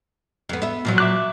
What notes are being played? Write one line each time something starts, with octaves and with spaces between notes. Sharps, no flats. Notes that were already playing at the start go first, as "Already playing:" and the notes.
F2 B3
B3 E5
A#2 F3 F#3
E5 D6 F#6